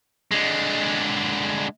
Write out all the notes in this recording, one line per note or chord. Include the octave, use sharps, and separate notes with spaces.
D3 G#3